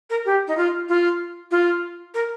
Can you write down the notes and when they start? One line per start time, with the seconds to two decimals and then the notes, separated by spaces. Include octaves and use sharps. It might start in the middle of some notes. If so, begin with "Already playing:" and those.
0.10 A#4
0.25 G4
0.47 D#4
0.57 F4
0.88 F4
1.51 F4
2.14 A#4